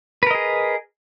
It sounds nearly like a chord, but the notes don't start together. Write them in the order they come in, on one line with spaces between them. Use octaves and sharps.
B4 A#4 D#5 G#4